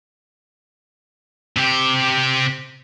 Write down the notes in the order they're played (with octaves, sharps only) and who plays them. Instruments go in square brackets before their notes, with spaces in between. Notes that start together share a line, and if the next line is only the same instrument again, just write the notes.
[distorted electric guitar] C3 G4